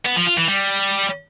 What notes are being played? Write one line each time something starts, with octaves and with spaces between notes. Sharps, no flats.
B3
F3
F4
E3
G3